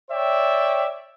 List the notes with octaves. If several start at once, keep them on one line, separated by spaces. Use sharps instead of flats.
C#5 D5 E5 G5